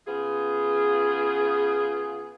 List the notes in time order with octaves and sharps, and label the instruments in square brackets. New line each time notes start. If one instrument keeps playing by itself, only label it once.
[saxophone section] C#3 B3 F4 G#4